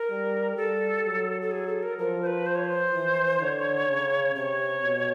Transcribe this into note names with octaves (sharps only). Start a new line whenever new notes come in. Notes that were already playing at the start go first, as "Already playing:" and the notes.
Already playing: A#4
G3
G3 A4
F#3
A4
G#4
A4
A#4
F3 A#4
C5
B4
C5
C#5
C5
E3
D3 C#5
C#3
C3 C#5
B2